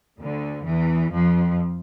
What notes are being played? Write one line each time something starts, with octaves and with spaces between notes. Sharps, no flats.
D2 D3
E2 E3
F2 F3